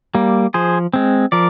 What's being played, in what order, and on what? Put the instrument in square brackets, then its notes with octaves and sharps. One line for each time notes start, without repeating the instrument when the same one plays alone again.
[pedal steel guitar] G3 A#3
F3 G#4 C5
G#3 C4
F3 A#4 D5